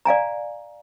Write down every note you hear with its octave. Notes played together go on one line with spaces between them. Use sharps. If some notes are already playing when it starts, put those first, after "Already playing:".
D5 F5 G#5 A#5